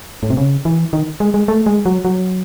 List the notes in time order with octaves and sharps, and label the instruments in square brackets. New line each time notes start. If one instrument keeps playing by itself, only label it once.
[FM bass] A2
C3
C#3
E3
D#3
G#3
G#3
A3
G#3
F#3
F#3